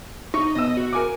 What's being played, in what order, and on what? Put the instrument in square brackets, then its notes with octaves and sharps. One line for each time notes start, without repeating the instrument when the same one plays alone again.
[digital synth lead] D#4 [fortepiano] C#6
[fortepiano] B2 E6 [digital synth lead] D#5
[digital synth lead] F#4
[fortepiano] A#4 G#5 D6